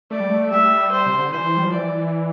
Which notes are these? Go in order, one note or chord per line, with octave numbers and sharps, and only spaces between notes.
A3 D5
G3
A3
G3 E5
C5
C3
D3
E3 C5
G3
F3
E3 D5